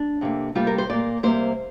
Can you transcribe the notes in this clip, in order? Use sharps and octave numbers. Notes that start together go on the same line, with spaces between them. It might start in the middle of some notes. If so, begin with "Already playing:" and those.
Already playing: D4
F2 C3 A#3
D2 C3 G3 A#3 F4
A#4
C5
A#2 A#3 D5
C3 G3 A#3 C5